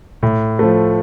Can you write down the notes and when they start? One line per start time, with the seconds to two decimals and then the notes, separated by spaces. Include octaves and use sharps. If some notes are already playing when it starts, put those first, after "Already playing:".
0.23 A2
0.59 F3 A3